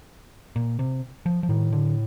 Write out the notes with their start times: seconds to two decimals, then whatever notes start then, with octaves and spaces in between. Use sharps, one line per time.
0.56 A#2
0.79 C3
1.26 F3
1.43 F3
1.49 A2 D#3
1.72 D3